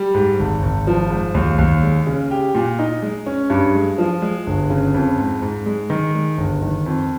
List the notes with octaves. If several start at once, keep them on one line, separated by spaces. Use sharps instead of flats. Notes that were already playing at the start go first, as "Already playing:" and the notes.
Already playing: G3
G#2
G#1
G#1
F3
G#2
D#2
D#2
G#3
C#3
G4
A#2
D#4
G#3
C#4
G2
G#3
F3
G#3
G1
C#3
F2
G#2
G#2
G#3
D#3
G#3
G1
D#3
F2